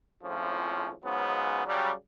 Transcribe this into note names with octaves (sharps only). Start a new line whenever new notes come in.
G#1 F2 A2 F3 C#4
C#2 G#2 C#3 F#3 B3
C#3 F#3 G3